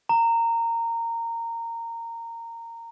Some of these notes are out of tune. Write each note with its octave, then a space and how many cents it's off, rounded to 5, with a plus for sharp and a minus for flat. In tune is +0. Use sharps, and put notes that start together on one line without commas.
A#5 -15